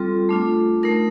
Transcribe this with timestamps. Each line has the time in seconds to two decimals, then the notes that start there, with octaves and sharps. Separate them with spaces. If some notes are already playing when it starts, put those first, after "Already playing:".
Already playing: G3 C4 F4 A4
0.29 A3 D4 F4
0.83 A3 D#4 A#4